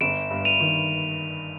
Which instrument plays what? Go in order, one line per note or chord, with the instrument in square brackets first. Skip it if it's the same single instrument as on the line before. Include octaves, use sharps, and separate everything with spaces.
[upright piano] G1 [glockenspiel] D7 E7
[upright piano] G2
[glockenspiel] D#7 F7
[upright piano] D#3